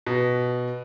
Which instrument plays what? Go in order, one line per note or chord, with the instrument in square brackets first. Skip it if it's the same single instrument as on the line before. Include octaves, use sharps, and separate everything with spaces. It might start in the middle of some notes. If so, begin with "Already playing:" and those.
[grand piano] B2